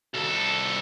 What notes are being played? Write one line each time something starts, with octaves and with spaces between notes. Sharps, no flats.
C2 A4